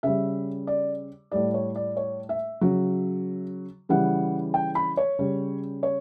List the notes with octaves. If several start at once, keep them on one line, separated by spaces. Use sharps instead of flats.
C#3 G3 E5
D5
A2 G3 D5
C#5
D5
C#5
E5
C#3 F#3
C#3 E3 G3 F#5
G5
B5
C#5
C#3 G3
C#5